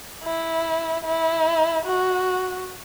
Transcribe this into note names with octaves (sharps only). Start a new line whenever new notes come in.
E4
E4
F#4